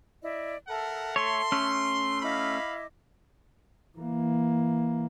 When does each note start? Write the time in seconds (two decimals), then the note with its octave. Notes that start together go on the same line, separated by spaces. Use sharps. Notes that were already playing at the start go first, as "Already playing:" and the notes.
0.22 E4 D5 D#5
0.67 A4 A#4 E5 F#5 A5
1.16 A3 C#5 C6
1.52 A3 C#4
2.22 E4 D#5 F5 B5 D6
3.98 E3 A#3